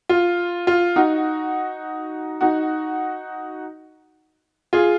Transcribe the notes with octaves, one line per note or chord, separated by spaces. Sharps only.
F4
F4
D#4 F#4
D#4 F#4
F4 G#4